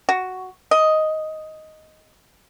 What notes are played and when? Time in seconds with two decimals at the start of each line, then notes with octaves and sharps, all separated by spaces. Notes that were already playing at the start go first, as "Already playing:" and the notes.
0.09 F#4
0.71 D#5